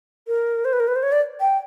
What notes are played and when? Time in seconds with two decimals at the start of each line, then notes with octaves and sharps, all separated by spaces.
0.28 A#4
0.65 C5
0.73 B4
0.80 A#4
0.88 B4
0.96 C5
1.03 C#5
1.12 D5
1.41 G5